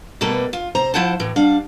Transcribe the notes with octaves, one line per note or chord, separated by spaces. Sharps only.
B2 G3 A3 A#3 A4 B4
F4
C3 C5 A#5
F3 E4 C5 F#5 A5
A2 E3
G3 D4 F5 F#5